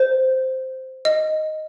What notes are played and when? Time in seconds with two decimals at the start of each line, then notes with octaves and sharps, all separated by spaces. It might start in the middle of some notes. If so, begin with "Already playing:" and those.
Already playing: C5
1.05 D#5